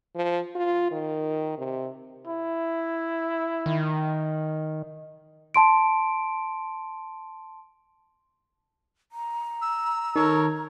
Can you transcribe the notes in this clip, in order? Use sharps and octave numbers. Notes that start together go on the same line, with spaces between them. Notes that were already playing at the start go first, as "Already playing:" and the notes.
F3
F4
D#3
C3
E4
D#3
A5 C6 D7
A#5
E6
D#3 A4 A#4 C#5